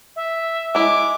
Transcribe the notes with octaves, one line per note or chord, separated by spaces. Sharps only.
E5
G#3 E4 D6